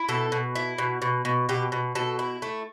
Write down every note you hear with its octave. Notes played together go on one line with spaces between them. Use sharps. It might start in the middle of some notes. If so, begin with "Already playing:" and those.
Already playing: E4
B2 A4
B2
E4
B2
B2
B2
B2 G4
B2
B2 A4
E4
A3